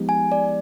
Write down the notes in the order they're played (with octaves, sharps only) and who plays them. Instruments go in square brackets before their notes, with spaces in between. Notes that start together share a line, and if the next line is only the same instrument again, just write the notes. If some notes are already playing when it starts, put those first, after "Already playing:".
Already playing: [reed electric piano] F3 G#3 B3 D#4 G4
[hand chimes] G#5
D5